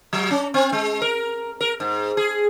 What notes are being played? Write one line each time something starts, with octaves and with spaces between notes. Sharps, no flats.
F#3
C#4
C4
G#3
A#4
A#4
G#2
G#4